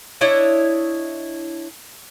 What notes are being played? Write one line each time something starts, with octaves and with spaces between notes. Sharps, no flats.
D4 E4 C#5 D#5